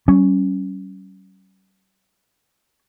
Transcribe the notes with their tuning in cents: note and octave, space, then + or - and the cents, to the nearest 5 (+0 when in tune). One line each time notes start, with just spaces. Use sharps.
G3 -45 C#4 +0